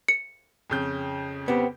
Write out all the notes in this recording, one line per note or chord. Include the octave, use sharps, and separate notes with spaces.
C#7
F2 C#3 G6
B3 C4 G4